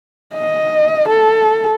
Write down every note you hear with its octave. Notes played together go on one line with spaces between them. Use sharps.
D#5
A4